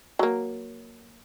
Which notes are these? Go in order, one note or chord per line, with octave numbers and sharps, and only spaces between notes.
F#3 A#3